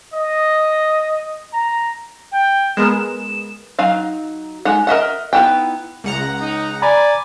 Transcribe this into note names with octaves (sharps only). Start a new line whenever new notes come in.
D#5
A#5
G5
G#3 B3 A#4 E7
F#3 D#4 F5
G#3 D#4 F#5
A#4 D#5 E5 F#5
B3 D#4 E4 F#5 G5
C#2 F#5 A#5
D#4
D5 G#5 A#5 B5